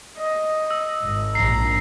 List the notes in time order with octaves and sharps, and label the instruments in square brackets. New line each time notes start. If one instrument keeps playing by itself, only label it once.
[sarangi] D#5
[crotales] E6
[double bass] G#1
[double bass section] A#1 [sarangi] A#5 [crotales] C7